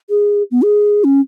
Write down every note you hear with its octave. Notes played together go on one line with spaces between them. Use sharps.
G#4
B3
G#4
C#4